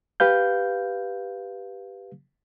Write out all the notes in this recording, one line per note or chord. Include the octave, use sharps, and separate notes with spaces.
G4 B4 F5 G6